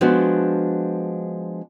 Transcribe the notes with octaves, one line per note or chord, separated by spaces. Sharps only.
F3 G#3 B3 D4 F#4